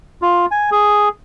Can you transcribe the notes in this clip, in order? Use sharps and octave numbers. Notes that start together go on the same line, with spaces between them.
F4
G#5
G#4